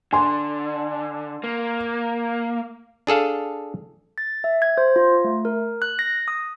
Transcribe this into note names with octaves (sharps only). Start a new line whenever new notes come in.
D3 G#5 C6
A#3
D4 G#4 A4 F5
A6
E5
G#6
C5
F4
A3
A#4
F#6
A#6
D#6